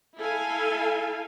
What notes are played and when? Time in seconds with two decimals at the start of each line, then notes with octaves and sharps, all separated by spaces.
0.17 E4 A4 F5 G#5